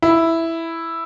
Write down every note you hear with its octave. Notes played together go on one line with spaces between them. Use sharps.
E4